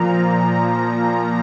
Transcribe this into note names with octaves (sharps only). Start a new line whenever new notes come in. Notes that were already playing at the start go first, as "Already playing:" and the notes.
Already playing: A#2 F3 A#5